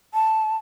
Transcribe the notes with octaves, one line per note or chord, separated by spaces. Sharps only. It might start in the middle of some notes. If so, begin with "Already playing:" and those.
A5